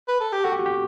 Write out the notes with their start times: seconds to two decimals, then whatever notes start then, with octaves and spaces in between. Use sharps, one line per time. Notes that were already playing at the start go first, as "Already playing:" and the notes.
0.08 B4
0.20 A4
0.32 G4
0.44 F#4 A4
0.52 G4
0.59 F#4
0.66 G4